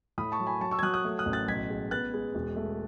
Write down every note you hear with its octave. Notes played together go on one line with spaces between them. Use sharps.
A2 B5 D#6
A5 C#6
F#3
G#5 B5
F#3 A5 C#6
C#6 E6
G#6
F#3 D#6 F#6
D#6 F#6
A3
D#6 F#6
A1
F#6 A6
B1 G#6 B6
G#3
B3 F#6 A6
G#3
E1
A3